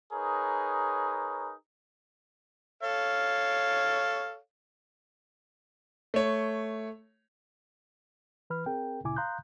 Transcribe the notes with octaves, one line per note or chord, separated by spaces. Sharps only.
D#4 G#4 A#4 B4 C#5
A4 C#5 F5
A3 C#5
E3 B4 B5 F6
C4 G#4 A#4 G5
D2 A#2 C#3 E4 G#5 D6
F5 A#5 C6 D#6 F#6 G6